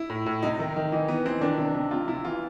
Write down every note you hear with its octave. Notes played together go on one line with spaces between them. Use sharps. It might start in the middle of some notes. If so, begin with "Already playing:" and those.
Already playing: E4
A2
A2
C3 D#4
D#3
D#3
E3 D#4
E3 B3
E3 C4
D#3 D4
C3
C3
C3 F4
C3 E4
E3 F4